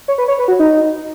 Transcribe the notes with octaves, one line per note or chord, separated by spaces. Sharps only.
C#5
B4
C#5
B4
F#4
D#4